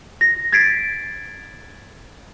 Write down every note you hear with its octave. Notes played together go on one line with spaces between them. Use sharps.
A#6
G#6 A6 B6 C7 D7